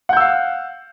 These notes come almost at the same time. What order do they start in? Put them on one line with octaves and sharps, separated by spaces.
F#5 G6 E6 F5